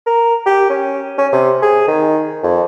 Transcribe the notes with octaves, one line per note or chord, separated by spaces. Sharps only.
A#4
G4
C#4
C#4
C3
G#4
D#3
F2